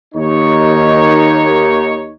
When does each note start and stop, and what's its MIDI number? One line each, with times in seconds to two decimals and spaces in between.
0.15 2.11 39
0.15 2.11 63
0.15 2.11 73